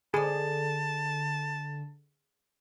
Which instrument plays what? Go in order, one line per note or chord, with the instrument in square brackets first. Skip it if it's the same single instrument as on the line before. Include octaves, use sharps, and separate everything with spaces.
[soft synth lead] D3 [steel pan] G#4 [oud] A4 D5 [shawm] A5